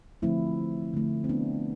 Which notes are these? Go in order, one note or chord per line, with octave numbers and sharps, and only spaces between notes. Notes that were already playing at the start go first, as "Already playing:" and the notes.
D3 F3 A3 C4 E4
D3 A3
C4
B3 D4